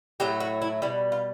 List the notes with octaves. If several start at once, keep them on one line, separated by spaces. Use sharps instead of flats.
A2 F#3 A3 G4
F#4
E4
B2 G3 E4
F4